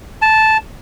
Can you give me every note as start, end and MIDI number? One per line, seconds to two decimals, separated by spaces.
0.22 0.57 81